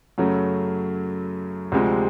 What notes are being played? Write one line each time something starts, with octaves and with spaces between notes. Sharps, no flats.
F#2 C#3 F#3 A3
D2 C3 F3 G#3 C4